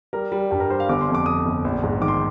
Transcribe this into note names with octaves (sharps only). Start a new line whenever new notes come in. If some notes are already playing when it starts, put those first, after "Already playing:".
G3 A#4
G3
G2 G4
A#4
G3 C5
F5
G1 D6
C6
F2
D6
F2 D#6
G1
A#1
G#2
D#3 D6
C6